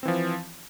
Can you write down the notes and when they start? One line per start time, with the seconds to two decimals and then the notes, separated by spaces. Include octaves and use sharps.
0.03 C4
0.05 E3
0.08 F3